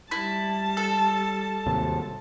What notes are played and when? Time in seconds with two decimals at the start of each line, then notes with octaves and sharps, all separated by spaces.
0.11 G3 E4 A5
0.77 A4
1.66 G#1 D#2 C3